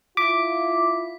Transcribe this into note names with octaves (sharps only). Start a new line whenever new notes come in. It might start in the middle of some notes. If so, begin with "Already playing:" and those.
E4 F4 D6 B6